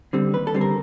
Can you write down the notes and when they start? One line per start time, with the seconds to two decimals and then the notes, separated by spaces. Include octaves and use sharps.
0.13 D3 G3 C4
0.33 D#2 B4
0.47 A4
0.54 D3 G3 C4
0.61 A#4